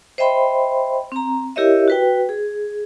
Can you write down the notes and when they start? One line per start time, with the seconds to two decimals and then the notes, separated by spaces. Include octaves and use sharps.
0.18 C5 D#5 E5 G5 B5 C6
1.12 C4 A#5
1.56 E4 G4 A#4 C#5 D#5 E5
1.88 F#4 B4 G5
2.29 G#4